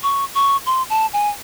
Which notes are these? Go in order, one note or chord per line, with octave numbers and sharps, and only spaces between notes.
C#6
C#6
C6
A5
G#5